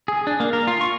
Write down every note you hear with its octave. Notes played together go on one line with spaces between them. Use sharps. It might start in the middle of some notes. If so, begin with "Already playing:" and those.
G#4
D4
A#3
A#4
F4
C#6